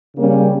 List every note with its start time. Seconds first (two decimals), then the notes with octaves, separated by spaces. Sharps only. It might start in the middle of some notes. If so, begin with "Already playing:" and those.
0.16 C#3 G3 A#3 C#4